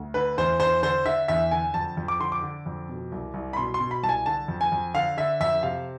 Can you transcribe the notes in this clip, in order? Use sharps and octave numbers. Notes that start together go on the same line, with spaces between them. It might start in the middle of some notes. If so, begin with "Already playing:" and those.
Already playing: D2
D3 B4
E2 C5
E2 C5
D3 C5
D3 E5
E2 E5
D3 G#5
F2 A5
F2
D6
D3 C6
D6
D3
F2
B2
C2
C2
B5
B2 C6
C6
B2
B5
C2 A5
G#5
D3 A5
F2
G#5
F2
D3 F5
D3 E5
F2 E5
C3 F5